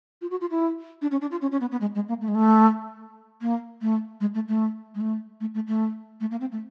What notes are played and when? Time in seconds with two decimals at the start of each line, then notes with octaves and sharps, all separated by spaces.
0.22 F4
0.31 F#4
0.41 F4
0.51 E4
1.02 D4
1.11 C#4
1.21 D4
1.31 F4
1.41 C#4
1.52 C#4
1.61 B3
1.71 B3
1.81 G#3
1.95 G#3
2.08 A#3
2.21 A3
2.28 G#3
2.35 A3
3.41 A#3
3.82 A3
4.21 G#3
4.34 A3
4.48 A3
4.95 G#3
5.00 A3
5.40 A3
5.54 A3
5.68 A3
6.20 A3
6.31 A#3
6.40 C4
6.52 A3